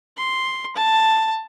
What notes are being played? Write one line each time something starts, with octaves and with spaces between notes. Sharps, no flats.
C6
A5